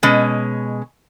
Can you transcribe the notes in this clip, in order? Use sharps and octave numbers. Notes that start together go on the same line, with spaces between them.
B2 G#3 C#4